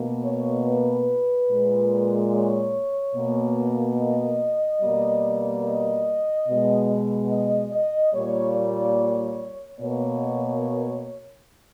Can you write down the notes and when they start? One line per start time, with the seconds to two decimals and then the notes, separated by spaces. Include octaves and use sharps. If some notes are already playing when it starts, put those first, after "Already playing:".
Already playing: B2 A#3
0.25 C#5
0.66 B4
1.49 A#2 G#3
2.32 C#5
3.15 B2 A#3
3.98 D#5
4.82 B2 G3 A#3
5.65 D#5
6.48 B2 G#3
7.31 D#5
7.72 D#5
8.14 A#2 G3 A#3 C#5
8.55 C#5
9.80 B2 A#3 C#5